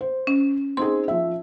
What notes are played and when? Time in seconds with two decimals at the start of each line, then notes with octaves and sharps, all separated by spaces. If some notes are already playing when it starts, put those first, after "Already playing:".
0.01 C5
0.27 C#4
0.77 C4 D#4 G#4 C6
1.08 F3 E5